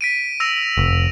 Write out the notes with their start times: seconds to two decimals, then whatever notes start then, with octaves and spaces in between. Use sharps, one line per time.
0.01 B6 D7 D#7
0.40 E6 A#6 F7
0.77 F1